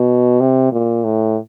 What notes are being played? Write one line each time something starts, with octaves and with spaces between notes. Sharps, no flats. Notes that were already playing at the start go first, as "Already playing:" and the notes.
Already playing: B2
C3
A#2
A2